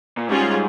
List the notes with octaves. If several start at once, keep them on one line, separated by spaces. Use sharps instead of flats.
A#2
G#2 G3 C#4 F4 G#4